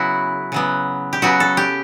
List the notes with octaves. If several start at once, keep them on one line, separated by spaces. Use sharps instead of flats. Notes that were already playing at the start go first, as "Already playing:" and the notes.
Already playing: C#3 F#3 B3 E4 F#4
C#3 F#3 B3
G4
C#3 F#3 B3 F#4
A4
G4